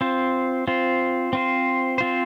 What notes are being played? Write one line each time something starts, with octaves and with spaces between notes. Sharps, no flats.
C4 F4 C5
C4 F4 C5
C4 F4 C5
C4 F4 C5